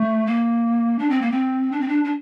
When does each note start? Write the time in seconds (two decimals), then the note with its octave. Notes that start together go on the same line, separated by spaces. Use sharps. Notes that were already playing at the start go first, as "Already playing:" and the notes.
Already playing: A3
0.27 A#3
0.99 D4
1.10 C4
1.21 A#3
1.32 C4
1.72 D4
1.80 C4
1.88 D4
2.04 D4